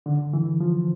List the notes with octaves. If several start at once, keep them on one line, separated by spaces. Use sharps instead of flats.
D3
E3
F3